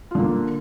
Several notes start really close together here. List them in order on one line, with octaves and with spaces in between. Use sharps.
F4 D3 A#3